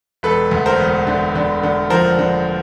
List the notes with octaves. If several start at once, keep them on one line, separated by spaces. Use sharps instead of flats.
E1 A4 B4
D2
A#4 C5
E1
D3
D3
D3
F3 A#4 C5
D3